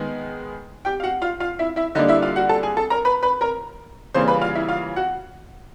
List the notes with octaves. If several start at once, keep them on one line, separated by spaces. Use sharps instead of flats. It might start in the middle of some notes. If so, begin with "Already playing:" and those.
Already playing: D#3 G#3 B3
G4 G5
F5
F#4 F#5
F4 F5
F4 F5
E4 E5
E4 E5
D3 G3 A#3 D4 D#4 D#5
E4 E5
F4 F5
F#4 F#5
A4 A5
G#4 G#5
A4 A5
A#4 A#5
B4 B5
B4 B5
A#4 A#5
C#3 E3 G3 A#3 C5 C6
B4 B5
F4 F5
E4 E5
F4 F5
F#4 F#5